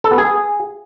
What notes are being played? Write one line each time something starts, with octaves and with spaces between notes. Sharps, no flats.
A4
B3
G#4